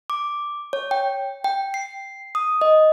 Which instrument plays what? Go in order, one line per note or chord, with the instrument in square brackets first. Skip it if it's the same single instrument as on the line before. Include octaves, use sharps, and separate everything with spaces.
[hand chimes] D6
C#5
G5
G5
C7
D#6
D#5